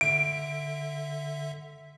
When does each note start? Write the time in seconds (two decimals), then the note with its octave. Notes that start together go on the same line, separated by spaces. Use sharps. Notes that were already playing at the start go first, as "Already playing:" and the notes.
0.01 D3 E5 D7